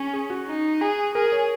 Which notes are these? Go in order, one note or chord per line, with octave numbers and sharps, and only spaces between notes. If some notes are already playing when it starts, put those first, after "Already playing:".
Already playing: C#4 G#4
G#4
F#4
D#4
G#4
G#4 A#4
C#5